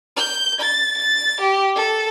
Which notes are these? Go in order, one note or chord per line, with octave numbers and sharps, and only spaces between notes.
G6
A6
A6
G4
A4